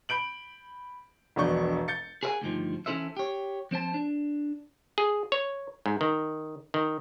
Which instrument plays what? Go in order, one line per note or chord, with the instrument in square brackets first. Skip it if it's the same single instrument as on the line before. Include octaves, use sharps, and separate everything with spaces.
[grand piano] B5 G6 D7 F#7
E1 A#1 B2 D4 C#6 G6
G6 A6 C#7
[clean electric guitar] G#4 A#4 C5 E5 F#5 G#5
D2 G2 D#3 F3
E3 C#4 E4 A4 C5 E5
G4 C#5
F3 C4 C5 A5
D4
[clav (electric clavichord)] G#4
C#5
G#2
D#3
D#3